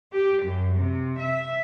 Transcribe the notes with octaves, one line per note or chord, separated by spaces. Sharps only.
G4
F#2
C3
E5